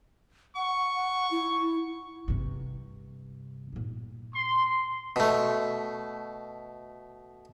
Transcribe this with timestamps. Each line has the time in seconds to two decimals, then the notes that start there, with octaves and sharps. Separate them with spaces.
0.56 F#5 C#6
0.95 F#5
1.31 E4
2.28 G2 C3
3.72 A#2 D#4
4.35 C6
5.16 B2 A3